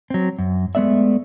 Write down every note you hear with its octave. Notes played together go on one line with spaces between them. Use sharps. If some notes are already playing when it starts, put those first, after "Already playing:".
F#3 C4
F#2
G#3 A3 B3 D5 E5